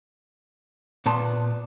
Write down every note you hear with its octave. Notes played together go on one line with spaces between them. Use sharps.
A#2 B3 A5 C6